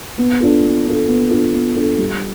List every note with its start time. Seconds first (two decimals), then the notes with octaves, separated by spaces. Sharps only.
0.18 B3
0.40 D4 F4 A4
0.63 B3
0.86 D4 F4 A4
1.08 B3
1.31 D4 F4 A4
1.54 B3
1.76 D4 F4 A4
1.98 G3